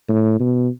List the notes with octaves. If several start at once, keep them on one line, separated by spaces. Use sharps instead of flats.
A2
B2